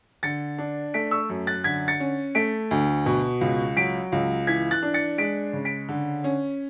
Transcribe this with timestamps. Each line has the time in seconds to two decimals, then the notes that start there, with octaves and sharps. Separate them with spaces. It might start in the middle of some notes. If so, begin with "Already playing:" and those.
0.23 D3 A6 C#7
0.58 D4
0.94 A3 B6 D7
1.11 C#6 E6
1.29 F#2
1.47 F#6 A6
1.64 D3 G#6 B6
1.88 A6 C#7
2.00 C#4
2.35 A3 B6 D7
2.71 D2
3.06 B2
3.41 C#2
3.77 F#3 B6 D7
4.12 C#2
4.47 E3 G#6 B6
4.71 F#6 A6
4.83 D4
4.94 A6 C#7
5.18 G#3 B6 D7
5.53 C#3
5.65 B6 D7
5.89 D3
6.24 C#4